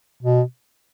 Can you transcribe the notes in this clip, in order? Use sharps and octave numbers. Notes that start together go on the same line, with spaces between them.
B2